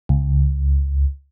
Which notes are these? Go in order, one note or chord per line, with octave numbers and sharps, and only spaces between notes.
C#2